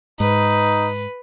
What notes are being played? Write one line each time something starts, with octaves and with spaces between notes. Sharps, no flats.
G#2 D#4 B4